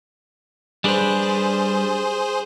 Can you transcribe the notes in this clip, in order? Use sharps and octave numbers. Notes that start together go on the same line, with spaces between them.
G3 D4 G#4 B4 C5